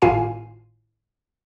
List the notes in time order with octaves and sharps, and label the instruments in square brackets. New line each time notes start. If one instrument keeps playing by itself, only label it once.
[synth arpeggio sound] G#1 A2 F4 F5 G#5 C7